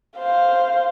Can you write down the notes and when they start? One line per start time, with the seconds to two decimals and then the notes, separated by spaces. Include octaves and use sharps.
0.17 C5 F5